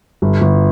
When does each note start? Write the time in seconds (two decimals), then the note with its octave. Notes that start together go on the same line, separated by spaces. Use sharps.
0.22 G1
0.41 G1